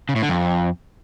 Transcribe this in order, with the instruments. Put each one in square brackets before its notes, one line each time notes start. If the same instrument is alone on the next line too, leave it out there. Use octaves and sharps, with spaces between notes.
[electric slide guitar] C#3
A2
D3
F2